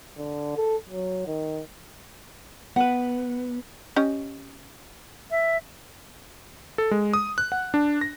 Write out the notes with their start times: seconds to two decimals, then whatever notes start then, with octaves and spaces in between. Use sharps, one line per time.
0.18 D3
0.57 A4
0.89 F#3
1.27 D#3
2.76 B3 B4 F#5
3.96 C#4 G4 D#5
5.31 E5
6.78 A4
6.91 G#3
7.13 D#6
7.38 F#6
7.52 F#5
7.74 D4
8.01 A#6